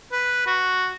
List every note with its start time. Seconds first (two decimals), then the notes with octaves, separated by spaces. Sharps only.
0.12 B4
0.47 F#4